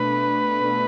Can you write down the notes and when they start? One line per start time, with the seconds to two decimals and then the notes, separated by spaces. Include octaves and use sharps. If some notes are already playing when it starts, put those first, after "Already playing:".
Already playing: B2 A3 D4 B4
0.61 B2 A3 D4